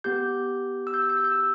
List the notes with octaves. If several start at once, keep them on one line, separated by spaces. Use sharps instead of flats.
B3 G4 G6
E6
G6
E6
G6
E6
G6
E6